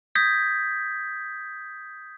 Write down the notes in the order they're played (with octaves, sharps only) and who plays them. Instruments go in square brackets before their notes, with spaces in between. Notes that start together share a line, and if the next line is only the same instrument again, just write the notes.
[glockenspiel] D#6 G6 G#6 A#6 B6